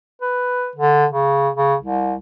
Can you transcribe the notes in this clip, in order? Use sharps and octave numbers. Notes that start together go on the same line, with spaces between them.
B4
D3
C#3
C#3
C2